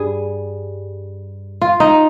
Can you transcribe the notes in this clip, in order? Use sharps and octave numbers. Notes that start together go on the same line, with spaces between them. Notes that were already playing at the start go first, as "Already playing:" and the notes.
Already playing: G2 G3 G#4
F4
D#4